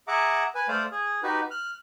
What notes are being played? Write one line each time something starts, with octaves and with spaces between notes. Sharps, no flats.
G#4 E5 F#5 A#5 D6
B4 G#5
A3 C5 D5 F5
G#4
D#4 F#4 G4 B4
F6 F#6